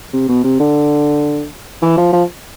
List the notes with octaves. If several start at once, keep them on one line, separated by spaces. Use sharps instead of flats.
C3
B2
C3
D3
E3
F3
F3